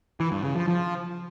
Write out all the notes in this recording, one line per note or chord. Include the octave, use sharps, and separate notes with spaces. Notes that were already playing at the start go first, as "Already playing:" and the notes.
E3
G2
C#3
F3
F3